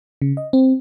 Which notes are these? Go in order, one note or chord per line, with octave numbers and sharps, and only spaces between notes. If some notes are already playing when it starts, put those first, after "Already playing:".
C#3
D#5
C4